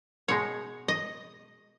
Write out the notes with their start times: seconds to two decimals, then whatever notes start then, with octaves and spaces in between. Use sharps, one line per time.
0.28 B2 G#3 D#4 C#5
0.88 D#5